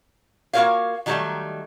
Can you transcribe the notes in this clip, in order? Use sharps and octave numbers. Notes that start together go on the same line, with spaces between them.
A#3 F4 F#4 A#4 C#5 F5
D#3 F#3 G3 A3 D#4